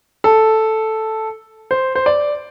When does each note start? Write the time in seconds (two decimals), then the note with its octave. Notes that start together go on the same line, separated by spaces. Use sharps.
0.24 A4
1.71 C5
1.95 C5
2.06 D5